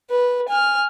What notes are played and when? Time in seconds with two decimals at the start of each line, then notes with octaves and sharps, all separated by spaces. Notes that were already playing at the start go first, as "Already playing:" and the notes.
0.10 B4
0.49 G#5 F6